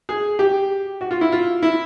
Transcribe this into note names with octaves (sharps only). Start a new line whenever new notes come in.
G#4
G4
F#4
F4
E4
F4
E4